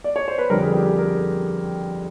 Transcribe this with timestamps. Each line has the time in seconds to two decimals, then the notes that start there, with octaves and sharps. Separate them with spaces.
0.04 D5
0.16 C#5
0.28 C5
0.38 B4
0.50 F2 D3 G3 A#4
0.62 G#4
0.74 G4
0.86 G#4
0.98 A#4